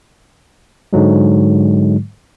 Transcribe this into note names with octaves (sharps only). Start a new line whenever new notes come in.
G#2 D3 F#3 G#3